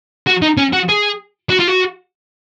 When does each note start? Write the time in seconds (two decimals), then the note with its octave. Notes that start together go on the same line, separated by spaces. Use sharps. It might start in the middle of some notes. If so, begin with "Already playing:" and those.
0.27 F#4
0.42 D#4
0.58 C#4
0.73 F#4
0.89 G#4
1.50 F#4
1.59 F4
1.68 F#4